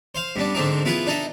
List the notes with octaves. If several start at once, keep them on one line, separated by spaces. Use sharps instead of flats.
C5 F5
G2 B3 D4
G#2 D3 C4 D4 D#4
B3 E4 F4 G#4 B4
D4 D#4 A4 D#5 E5